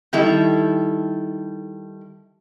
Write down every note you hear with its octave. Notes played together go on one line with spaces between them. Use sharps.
D#3 G3 E4 A4